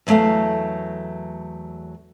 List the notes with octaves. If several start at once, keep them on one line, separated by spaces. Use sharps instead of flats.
E2 D#3 F#3 A3 F5